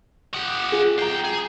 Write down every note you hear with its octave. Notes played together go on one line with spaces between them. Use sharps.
G4 F#5 D#6
F4 G#4
C2 G5 A#5 C7
G#4